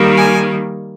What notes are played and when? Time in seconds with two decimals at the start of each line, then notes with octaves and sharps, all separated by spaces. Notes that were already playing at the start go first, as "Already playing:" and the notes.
Already playing: D#3 G3 A#3
0.17 G#5